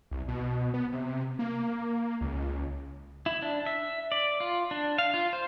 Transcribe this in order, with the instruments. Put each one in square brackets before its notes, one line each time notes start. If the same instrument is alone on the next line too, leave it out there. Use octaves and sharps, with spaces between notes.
[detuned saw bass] C2
B2
B3
C3
A#3
C#2
[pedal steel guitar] E4
D4
E5
D5
F4
D4
F5
F4
C5